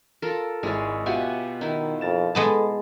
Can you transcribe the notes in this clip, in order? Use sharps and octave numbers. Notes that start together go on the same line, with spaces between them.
F4 A4 A#4
G#1 G#3 E4 C#5 A6
B2 F4 G4 E5 F#5 G#5
D#3 D#4 E4
F2 A#4 A6 E7
G#3 B3 A4 A5